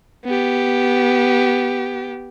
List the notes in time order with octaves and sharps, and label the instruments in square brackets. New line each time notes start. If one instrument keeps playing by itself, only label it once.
[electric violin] B3 G4